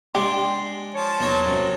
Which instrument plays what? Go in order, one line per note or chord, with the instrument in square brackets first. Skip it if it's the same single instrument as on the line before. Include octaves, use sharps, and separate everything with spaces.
[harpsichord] G#3 D4 [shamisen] G4 [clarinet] C6
[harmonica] F3 A5 [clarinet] C#5
[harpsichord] E2 D#4 C#5 [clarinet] F#3
[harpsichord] F#2 C3